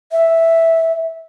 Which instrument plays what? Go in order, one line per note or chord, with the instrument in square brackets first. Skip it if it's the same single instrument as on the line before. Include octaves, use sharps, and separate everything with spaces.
[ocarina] E5